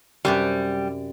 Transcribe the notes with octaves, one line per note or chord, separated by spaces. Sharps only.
F#2 C3 G3 B4